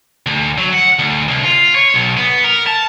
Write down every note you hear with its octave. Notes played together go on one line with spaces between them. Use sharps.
D2
F#3
F#5
D2
C2
F4
C#5
B1
B3
A#4
A5